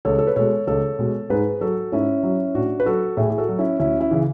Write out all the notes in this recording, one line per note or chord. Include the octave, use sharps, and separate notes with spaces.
C#2 A4 C#5
A4
B4
B2 G#3 A4 C#5
C#2 A4 C#5
B2 G#3
G#2 G#4 B4
F#3 F#4 A4
G#2 C#4 E4
F#3
A2 D4 F#4
B4
F#3 F#4 A4
A2 E4 G#4
G#4
F#4 A4
F#3
C#4 E4
D2 C#4 E4
C#4 E4
C#3 E3